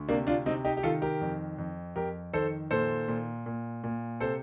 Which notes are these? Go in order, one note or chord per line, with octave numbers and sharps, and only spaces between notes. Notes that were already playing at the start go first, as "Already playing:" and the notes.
Already playing: D2
C3 A#3 D4
D4 F4
C3 C4 D#4
D#4 G4
G4
D#3 F4 A4
G4 A#4
F2
F2
F2 G4 A#4
D#3 A4 C5
A#2 A4 C5
A#2
A#2
A#2
C3 A4 C5